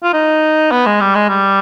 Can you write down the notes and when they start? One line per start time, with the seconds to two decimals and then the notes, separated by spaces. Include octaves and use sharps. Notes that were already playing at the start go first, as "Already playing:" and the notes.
0.03 F4
0.13 D#4
0.71 B3
0.86 G#3
1.01 G3
1.15 G#3
1.29 G3